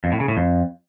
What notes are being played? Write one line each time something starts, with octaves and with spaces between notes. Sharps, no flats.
F2
A2
C#3
A2
F2